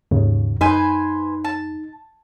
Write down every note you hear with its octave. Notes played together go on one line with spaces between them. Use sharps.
D#2 G#2 C#3
F#2 D#4 B4 C5 G#5
A5